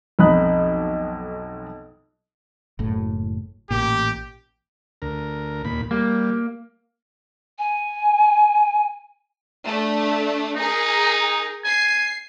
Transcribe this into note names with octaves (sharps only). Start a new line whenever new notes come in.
B1 F2 D#4 B5 D#6 F#6
F#1 A2
A1 A#2 G4
D2 A#4
D#2 A#2 B5
G3 A#3
G#5
A3 D4
D#4 G#4 A#4
G#5 C7